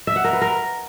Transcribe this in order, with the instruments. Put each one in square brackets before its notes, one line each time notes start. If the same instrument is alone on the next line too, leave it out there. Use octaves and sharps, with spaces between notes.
[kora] E5
F#5
A#4
B4
A#4